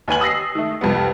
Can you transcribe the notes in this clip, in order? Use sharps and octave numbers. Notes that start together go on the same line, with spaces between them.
D#2 B4 G#5 F#7
D#6 E6 A#6 C7
D#3 A3
C2 F2 G3 B3